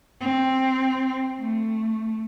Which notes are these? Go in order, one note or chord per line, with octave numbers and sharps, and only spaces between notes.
C4
A3